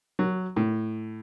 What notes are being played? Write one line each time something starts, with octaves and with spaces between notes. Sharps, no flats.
F#3
A2